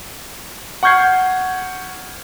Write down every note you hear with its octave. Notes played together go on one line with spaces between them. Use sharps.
F#5 C#6 F6 G6 G#6 C7